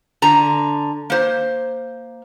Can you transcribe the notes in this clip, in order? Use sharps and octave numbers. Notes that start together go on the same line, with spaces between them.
D3 A#5
A#3 C5